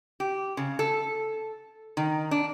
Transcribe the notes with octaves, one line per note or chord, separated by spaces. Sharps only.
G4
C#3
A4
D#3
D4